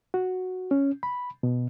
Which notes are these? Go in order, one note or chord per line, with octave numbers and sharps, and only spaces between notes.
F#4
C#4
B5
B2